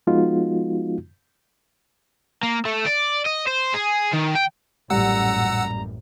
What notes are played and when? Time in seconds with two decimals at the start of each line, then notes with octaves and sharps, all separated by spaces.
0.07 F3 G#3 B3 D#4 F4 F#4
2.43 A#3
2.65 A3
2.86 D5
3.25 D#5
3.47 C5
3.74 G#4
4.13 D#3
4.35 G5
4.90 A1 F#2 A#2 G3 F#5 A#5 E6